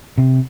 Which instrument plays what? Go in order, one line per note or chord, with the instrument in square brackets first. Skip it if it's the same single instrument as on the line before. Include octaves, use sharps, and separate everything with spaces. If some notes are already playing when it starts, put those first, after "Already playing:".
[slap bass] C3